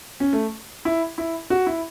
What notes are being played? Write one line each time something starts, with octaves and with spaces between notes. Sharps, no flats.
C#4
A3
E4
E4
F#4
E4